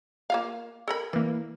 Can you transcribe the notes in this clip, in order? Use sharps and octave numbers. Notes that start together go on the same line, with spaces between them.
A#3 F4 F5
A4 A#4 B5
E3 A#3 D5